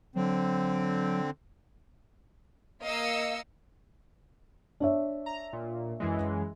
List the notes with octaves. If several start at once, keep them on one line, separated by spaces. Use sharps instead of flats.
D3 F#3 C4
A#3 D#5 F5 E6 C#7
D4 C#5 E5
A#5
A#2
F#2 E3 G#3